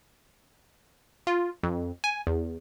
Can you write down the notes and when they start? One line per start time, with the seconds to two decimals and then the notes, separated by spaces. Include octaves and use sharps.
1.27 F4
1.63 F2
2.04 G#5
2.27 E2